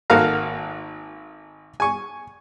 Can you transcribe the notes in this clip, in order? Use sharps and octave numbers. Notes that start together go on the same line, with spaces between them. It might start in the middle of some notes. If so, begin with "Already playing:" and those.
G#1 A#3 F#4 A4 F5 A#5
G#5 C#6